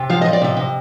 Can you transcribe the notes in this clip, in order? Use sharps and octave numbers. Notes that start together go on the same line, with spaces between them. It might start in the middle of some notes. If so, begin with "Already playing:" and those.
Already playing: C3
F3 F5
F3 D#5
D5
C3 D#5
C3